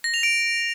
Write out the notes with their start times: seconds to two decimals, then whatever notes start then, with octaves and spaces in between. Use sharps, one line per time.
0.04 A#6
0.14 F7
0.23 D7